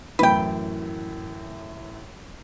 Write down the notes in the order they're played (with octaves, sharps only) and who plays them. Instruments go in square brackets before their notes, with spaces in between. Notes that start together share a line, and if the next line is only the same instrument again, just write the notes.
[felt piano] F#2 A2 E3 [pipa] B4 G5